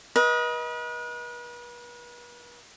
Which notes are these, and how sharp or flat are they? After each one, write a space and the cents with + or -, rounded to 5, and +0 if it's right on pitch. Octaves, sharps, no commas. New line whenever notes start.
B4 -40 D#5 +15